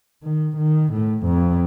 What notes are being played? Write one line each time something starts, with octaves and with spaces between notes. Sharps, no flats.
D#3
D#3
A2
F2